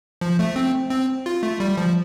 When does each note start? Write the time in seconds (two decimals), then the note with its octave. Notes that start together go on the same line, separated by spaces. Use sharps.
0.21 F3
0.39 A3
0.56 C4
0.90 C4
1.26 F4
1.43 A3
1.60 G3
1.77 F3